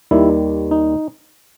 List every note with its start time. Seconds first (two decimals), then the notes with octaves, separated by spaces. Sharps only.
0.11 D#2 D#3 G3 E4
0.71 D#4